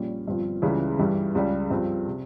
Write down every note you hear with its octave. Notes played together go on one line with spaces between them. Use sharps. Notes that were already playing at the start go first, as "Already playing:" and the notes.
Already playing: A#1 A#2 G3 C#4
G1 G2 F3 C4 F4
C#2 C#3 E3 G3
G2 E3 G3
C#2 C#3 G3
G2 F3 C4
C3